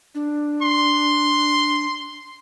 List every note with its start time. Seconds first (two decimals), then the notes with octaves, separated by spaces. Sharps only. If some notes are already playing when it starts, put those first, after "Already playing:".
0.15 D4
0.63 C6